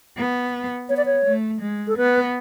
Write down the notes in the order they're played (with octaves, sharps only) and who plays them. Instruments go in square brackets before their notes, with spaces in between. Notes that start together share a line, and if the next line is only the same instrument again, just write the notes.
[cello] B3
[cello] B3 [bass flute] C#5
[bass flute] D5
C#5
[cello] A3
G#3
[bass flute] A4
[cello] B3 [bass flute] B4